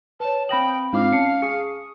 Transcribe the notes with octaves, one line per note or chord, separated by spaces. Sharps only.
B4 C#5 A5
C4 F5 G5 B5 D#6 A#6 F#7
G#2 C4 D4 D#4 F4 F5 D6
C#4 A5 C7 C#7
G#4 C#6 D#6 C#7